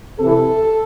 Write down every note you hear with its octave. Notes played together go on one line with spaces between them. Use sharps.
C3 E3 A4